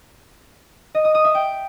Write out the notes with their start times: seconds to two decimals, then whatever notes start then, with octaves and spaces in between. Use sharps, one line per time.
0.95 D#5
1.05 D#6
1.15 D#6
1.25 E5
1.35 G5